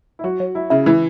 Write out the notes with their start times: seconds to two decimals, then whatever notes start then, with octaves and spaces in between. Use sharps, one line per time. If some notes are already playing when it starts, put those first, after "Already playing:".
0.19 E4
0.24 F#3 F#4
0.40 F#3
0.55 F#3 E4
0.70 C#3 E4
0.86 E3 E4